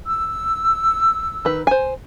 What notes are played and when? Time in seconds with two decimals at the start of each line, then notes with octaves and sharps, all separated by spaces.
0.06 E6
1.45 D#3 B4
1.67 C5 G#5